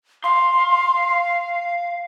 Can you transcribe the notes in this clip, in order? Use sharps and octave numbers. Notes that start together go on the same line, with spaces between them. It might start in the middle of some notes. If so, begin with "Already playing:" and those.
F5 C6